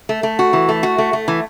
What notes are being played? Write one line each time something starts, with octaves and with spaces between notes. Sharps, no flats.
A3
A3
F#4
E3
A3
F#4
A3
A3
E3